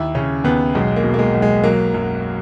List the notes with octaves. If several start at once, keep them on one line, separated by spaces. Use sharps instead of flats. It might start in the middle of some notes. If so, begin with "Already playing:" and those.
Already playing: D#2 E4
C#3 C#4
D#2 B3
B1 G#3
A#3
B2
A#3
G#3
B1
G#3
F#3 A#3
F#2